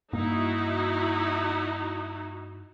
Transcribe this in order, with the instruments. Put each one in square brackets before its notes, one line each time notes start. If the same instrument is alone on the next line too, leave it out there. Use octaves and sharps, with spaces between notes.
[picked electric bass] G2 A#3 [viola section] D#4 E4 F#4